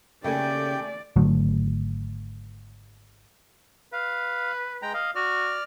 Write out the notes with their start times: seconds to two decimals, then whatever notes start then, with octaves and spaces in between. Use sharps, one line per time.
0.24 C#3 A3 A#3 G4 D5 G5 G#5
1.16 G#1 D3 F#3 A3
3.93 B4 F5
4.82 G#3 G5 A#5
4.94 D#5 F5
5.15 F#4 D5 F6